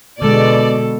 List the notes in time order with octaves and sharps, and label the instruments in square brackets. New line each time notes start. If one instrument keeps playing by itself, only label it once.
[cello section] B2 [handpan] D3 G#3 [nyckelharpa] A4 [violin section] D5